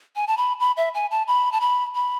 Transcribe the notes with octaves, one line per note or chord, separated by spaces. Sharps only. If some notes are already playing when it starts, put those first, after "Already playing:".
G#5
A5
B5
B5
E5
G#5
A5
B5
A5
B5
B5